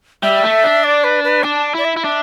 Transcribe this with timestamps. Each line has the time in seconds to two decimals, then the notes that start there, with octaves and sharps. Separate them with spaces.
0.23 G3 E5
0.43 A3
0.63 D4
0.84 D5
1.04 B4
1.24 B4
1.44 D4 A5
1.74 E4 D5
1.85 E5
1.97 E4
2.04 D4